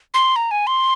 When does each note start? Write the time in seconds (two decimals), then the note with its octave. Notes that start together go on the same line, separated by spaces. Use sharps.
0.14 C6
0.36 A#5
0.51 G#5
0.67 C6